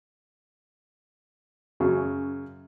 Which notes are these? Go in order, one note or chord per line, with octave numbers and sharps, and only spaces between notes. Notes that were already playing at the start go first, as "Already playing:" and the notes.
F#2 C#3